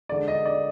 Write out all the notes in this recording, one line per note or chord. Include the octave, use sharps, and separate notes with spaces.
D3 G#3 D5
D#5
D5